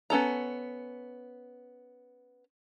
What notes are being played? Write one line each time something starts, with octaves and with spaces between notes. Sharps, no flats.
B3 C#4 A4 A#5